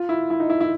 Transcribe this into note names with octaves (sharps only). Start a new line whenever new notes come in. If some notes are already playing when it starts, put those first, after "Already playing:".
Already playing: F4
E4
E4
D#4
E4
E4